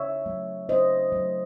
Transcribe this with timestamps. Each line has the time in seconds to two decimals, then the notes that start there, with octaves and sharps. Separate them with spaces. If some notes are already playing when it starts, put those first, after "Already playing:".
Already playing: C#3 C#5 E5
0.26 F#3 A3
0.69 C#3 C5 D#5
1.12 F#3 A3